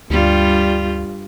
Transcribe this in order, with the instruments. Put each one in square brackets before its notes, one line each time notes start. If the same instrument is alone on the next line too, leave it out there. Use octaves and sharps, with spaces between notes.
[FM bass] D2 [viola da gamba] G2 G3 F4